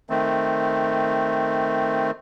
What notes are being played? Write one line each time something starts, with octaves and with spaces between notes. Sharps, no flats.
D#3 A3 C4